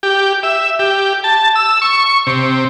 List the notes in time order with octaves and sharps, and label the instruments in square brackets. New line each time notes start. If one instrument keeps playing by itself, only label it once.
[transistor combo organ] G4
E5
G4
A5
E6
C#6
C3